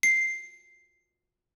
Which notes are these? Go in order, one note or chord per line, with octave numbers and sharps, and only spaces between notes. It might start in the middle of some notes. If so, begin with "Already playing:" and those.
C7